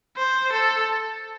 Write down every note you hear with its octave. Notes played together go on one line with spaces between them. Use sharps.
C5
A4